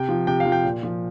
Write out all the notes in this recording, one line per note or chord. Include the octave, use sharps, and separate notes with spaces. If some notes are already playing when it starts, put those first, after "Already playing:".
Already playing: C3 G5
F3
C3 G5
F5
F3
G5
A#2
F3